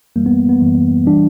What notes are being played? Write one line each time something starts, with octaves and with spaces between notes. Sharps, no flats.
F#2 E3 G3 A#3
B3
B3
F#2 E3 G3
E3 G3 D4